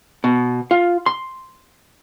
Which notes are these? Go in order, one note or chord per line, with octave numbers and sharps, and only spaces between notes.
B2
F4
C6